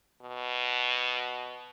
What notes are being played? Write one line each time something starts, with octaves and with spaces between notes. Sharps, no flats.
B2